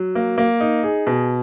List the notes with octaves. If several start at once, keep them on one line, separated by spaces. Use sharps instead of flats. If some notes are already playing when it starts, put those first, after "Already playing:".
Already playing: F#3
A#3
A#3
D#4
G#4
B2